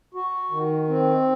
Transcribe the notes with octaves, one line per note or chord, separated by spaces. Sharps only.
F#4
D#3
C4